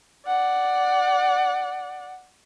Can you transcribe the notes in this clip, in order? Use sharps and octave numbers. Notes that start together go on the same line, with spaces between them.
D5 F#5